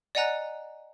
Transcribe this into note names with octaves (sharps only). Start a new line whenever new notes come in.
D5 D#5 F#5 G#5 A#5 F#6